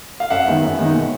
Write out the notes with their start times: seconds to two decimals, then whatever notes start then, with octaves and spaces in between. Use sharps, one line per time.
0.20 F5
0.30 F#2 E5 F#5
0.47 D#3 G#3 B3 D#4
0.63 F#2
0.79 D#3 G#3 B3 D#4
0.94 B2